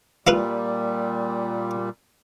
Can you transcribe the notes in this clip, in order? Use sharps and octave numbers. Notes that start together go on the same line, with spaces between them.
A#2 G3 E4 F4 B4